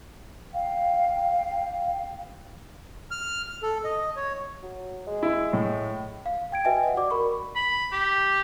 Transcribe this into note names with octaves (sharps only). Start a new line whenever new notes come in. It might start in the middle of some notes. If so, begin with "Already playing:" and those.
F5 G5
F6
A4
D#5
C#5
F#3
G#3
E4
A2
F5
G5 G#6 D7
F#4 B4 D#5 E5 G5 G#5
D#5 F#5
F#4 D5 D6
A#4 B5 C#6
B5
G4